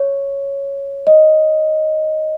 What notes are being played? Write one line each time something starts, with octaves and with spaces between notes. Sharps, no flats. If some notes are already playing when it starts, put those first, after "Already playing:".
Already playing: C#5
D#5